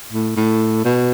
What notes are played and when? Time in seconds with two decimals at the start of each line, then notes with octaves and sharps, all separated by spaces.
0.12 A2
0.37 A2
0.85 B2